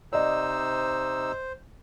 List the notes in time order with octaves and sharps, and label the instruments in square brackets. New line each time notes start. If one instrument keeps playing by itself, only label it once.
[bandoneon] C3 D#4 E6 [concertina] C5 [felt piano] D5 D#5